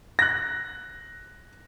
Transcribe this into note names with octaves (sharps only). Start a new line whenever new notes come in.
F#6 A#6